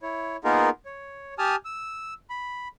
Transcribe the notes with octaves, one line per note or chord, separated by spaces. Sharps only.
E4 C#5
A#3 B3 D#4 F4 G#4 A#4
C#5
G4 G#5 A5 D#6 F6
E6
B5